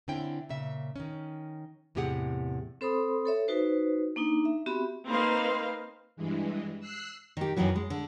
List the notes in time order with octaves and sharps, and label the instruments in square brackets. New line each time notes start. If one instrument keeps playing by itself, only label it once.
[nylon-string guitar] D3 C4 C#4 E4 G5
A#2 C#3 E5
D#3 C#4
E2 A2 C3 G4 G#4 F#5
[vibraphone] C4 A4 C5 B5 C6 D#6
A4 C#5 E5
D#4 F#4 B4 C5
A#3 D4 D#4
E5
B3 C4 F#4 G4 E5 B5
[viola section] A#3 C4 D#4 B4 C5 F5
[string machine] G2 E3 G#3
E6 F#6 C7
[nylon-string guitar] D#3 G4
F#2 A2 D#3 E3 F#3
G#3
D3